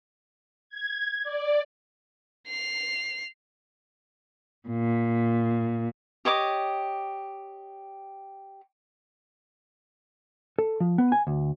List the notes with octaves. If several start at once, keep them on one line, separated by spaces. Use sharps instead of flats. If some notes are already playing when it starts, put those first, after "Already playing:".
G#6
D5
C7 F7
A#2
G4 C#5 D#5 D6
A4
F3
B3
G#5
D2